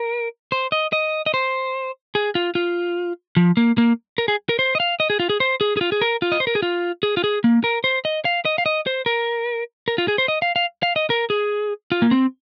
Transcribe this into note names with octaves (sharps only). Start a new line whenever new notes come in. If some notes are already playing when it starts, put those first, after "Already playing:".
Already playing: A#4
C5
D#5
D#5
D#5
C5
G#4
F4
F4
F3
A#3
A#3
A#4
G#4
A#4
C5
D#5
F5
D#5
G#4
F4
G#4
C5
G#4
G#4
F4
G#4
A#4
F4
D#5
C5
A#4
G#4
F4
G#4
F4
G#4
A#3
A#4
C5
D#5
F5
D#5
F5
D#5
C5
A#4
A#4
F4
G#4
C5
D#5
F5
F5
F5
D#5
A#4
G#4
F4
A#3
C4